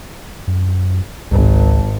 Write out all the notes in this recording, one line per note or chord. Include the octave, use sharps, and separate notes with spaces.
F#2
G#1 C#2